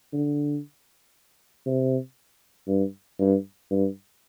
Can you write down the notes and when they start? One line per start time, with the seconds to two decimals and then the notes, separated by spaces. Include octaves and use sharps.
0.13 D3
1.66 C3
2.68 G2
3.20 G2
3.71 G2